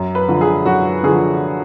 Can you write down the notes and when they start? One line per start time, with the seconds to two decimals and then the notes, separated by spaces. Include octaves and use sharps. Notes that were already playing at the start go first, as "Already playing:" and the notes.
Already playing: F#2
0.15 B4
0.28 D3 F3
0.41 G#4
0.65 F#2 F#4
1.03 D3 F3 G#4